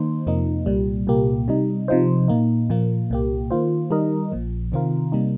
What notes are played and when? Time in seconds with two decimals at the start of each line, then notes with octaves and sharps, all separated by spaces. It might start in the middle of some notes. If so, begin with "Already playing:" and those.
Already playing: D#3 A#3 D#4 C5
0.27 F2 C3 F3 A#3 D#4
0.66 C2 A#2 G3
1.07 C2 A#2 A#3 G4
1.48 C3 G3 D#4
1.88 C3 F3 D#4 C5
2.28 A#2 A#3 D#4
2.70 A#2 F3 A#3
3.10 C2 A#2 A#3 G4
3.51 D#3 A#3 F4 C5
3.91 D#3 G3 D#4 A#4 D#5
4.32 A#1 A#2 F3
4.72 C3 D#3 C4 F4 A#4
5.12 C3 G3 A#3 D#4